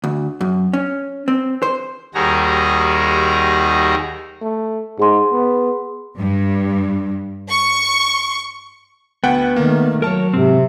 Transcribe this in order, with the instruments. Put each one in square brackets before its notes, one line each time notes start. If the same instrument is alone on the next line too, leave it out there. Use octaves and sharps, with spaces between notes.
[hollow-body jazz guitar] D2
F#2
C#4
C4
C5
[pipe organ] D#2 D#3 G3 F#4 G#4 A#5
[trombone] A3
[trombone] G#2 [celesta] G#4 C6
[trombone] B3
[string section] G2
C#6
[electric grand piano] D2 F#5 G5 [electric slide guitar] B3
[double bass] D#3 A3 [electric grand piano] A#3
[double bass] F#3 [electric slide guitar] A#4 C#5 [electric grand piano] A5 F6
[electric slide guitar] G#2 C4 [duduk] C3